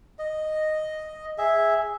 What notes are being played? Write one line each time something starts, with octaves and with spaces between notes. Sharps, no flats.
D#5
G#4 E5